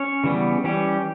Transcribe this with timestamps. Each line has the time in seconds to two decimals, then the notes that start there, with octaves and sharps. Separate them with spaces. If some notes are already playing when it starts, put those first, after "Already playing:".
Already playing: C#4 C#5
0.24 C#3 E3 G3 B3
0.64 E3 G3 C#4 G4